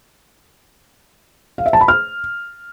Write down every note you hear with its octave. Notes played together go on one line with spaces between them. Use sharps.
F5
E5
A5
B5
F6